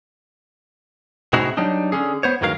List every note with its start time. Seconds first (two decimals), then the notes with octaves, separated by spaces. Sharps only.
1.33 A2 C3 D#4 E4 F#4 G#4
1.57 F#3 G3 D4 D#4
1.92 D3 C#4 G#4
2.23 B3 C5 C#5
2.41 D2 G2 D#3 F#3 A#4 F5